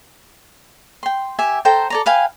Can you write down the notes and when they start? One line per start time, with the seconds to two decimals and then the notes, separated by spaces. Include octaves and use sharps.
1.03 G5 C6
1.39 G4 E5 G#5
1.65 A4 C5 G5 A#5
1.90 A4 D5 A#5
2.06 B4 F5 G5 G#5